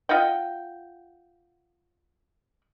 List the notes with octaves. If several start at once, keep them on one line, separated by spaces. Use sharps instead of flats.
F4 D#5 F#5 G5